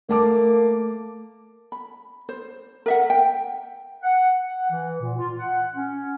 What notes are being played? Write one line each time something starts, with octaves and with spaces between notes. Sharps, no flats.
A3 A#3 A5 D6
B5
C5
A#4 E5 F#5
G5
F#5
F#5
E3
A#2
F4
F#5
C#4